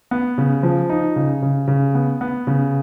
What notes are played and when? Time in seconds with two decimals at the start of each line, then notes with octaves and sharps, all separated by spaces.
0.11 B3
0.38 C#3
0.63 F3
0.89 D#4
1.16 C#3
1.42 C#3
1.67 C#3
1.95 B3
2.21 B3
2.47 C#3